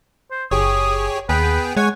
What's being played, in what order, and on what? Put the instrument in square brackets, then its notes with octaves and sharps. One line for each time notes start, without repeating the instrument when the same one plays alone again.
[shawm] C5
[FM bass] F#1 [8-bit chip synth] G4 G#4 C#5 [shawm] D#6
[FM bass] D#2 [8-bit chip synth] B3 G#4 G5 [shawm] B4
[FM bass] G#3 [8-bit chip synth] C#5 G#5 C#6 [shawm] F#5